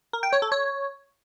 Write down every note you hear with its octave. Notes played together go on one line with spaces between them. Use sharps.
A#4
G5
C#5
A4
C#5